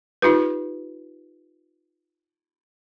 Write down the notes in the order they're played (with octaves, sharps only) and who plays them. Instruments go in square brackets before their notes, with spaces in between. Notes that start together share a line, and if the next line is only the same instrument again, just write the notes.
[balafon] D#4 F4 G4 B4